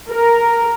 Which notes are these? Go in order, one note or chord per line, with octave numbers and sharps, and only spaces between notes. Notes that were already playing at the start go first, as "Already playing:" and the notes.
A#4